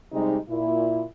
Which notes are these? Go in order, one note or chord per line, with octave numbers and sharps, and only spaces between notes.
C3 G3 G#3 D#4
A#2 E4